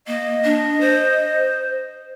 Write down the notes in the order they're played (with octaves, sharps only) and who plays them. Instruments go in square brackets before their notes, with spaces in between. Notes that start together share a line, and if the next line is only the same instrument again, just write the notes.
[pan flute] A#3 [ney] D#5
[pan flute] D4
C5